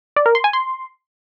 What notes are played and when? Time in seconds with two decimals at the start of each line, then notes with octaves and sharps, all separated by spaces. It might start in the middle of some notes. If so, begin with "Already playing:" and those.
0.16 D5
0.26 A#4
0.35 C6
0.44 G#5
0.53 C6